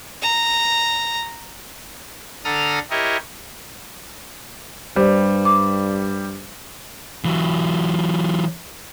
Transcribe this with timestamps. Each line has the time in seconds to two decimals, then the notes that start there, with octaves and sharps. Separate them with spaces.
0.22 A#5
2.45 D3 A4 A#5 D#6 F6
2.90 E4 G4 A#4 C#5 D#5
4.96 G2 G3 C5
5.45 D6
7.25 E3 F#3